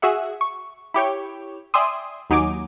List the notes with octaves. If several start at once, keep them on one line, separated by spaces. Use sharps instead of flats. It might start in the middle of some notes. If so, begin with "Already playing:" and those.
F#4 G#4 E5 F#5
C#6
E4 G4 C#5 G5
D5 E5 G5 G#5 C6 D#6
D#2 F#3 D#4 G#5 D6 D7